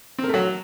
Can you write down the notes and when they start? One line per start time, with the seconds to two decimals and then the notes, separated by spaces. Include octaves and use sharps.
0.19 C4
0.24 A#4
0.29 A3
0.34 F#3